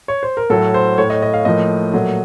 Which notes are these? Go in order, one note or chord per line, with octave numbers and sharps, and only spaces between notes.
C#5
C5
A#4
A2 F#3 A3 A4
C5
A2 A3 C#5
D#5
D#5
F5
A2 F3 A#3 D#5
A#2 F#3 A3